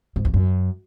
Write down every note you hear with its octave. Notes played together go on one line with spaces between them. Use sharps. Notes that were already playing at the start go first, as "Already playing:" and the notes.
G#2
E2
F#2